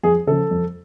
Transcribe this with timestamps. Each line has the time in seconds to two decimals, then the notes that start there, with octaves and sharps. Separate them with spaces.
0.03 F2 G#4
0.27 C#3 F3 A4
0.51 F2